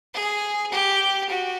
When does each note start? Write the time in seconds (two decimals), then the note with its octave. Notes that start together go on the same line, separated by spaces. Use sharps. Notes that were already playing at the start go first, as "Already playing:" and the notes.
0.14 G#4
0.72 G4
1.29 F#4